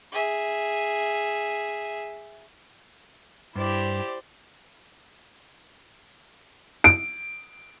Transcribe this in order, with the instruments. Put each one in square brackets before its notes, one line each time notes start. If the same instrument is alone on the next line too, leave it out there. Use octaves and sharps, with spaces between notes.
[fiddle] G#4 E5
[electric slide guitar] G2 [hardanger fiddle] E4 G4 [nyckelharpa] C5 D5
[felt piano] D7